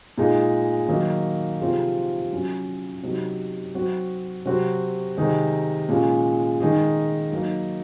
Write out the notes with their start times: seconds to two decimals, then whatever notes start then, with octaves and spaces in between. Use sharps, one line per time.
0.18 A#2 G#3 D#4 G#4
0.88 D#3 F#3 A#3 D#4
1.60 C3 F3 C4 F4 G#4
2.32 F#3 C#4 F#4
3.03 C3 F#3 C4 D#4 F#4
3.75 F#3 C4 F#4
4.45 C3 F#3 C4 F#4
5.17 C3 D#3 G#3 D#4 G#4
5.89 A#2 G#3 C#4
6.60 D#3 G#3 D#4 G#4
7.32 F#3 A#3 D#4